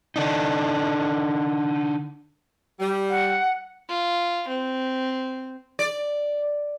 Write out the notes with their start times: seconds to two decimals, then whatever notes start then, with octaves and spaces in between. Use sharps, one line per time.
0.16 D3 D4 D#4
2.79 G3
3.10 F#5
3.89 F4
4.48 C4
5.79 D5